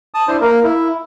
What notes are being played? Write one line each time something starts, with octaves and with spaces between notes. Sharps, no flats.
A5 D#6
D4 E4 C5
A#3 A#4
E4